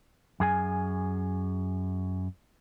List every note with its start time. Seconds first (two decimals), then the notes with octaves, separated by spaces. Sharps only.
0.40 F#2 G#4 G#5